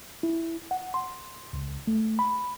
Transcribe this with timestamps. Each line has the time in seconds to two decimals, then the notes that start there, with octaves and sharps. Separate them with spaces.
0.23 E4
0.71 F#5
0.94 C6
1.53 C#2
1.87 A3
2.19 B5